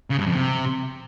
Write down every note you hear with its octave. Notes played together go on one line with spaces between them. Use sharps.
C#3
G2
F2
C3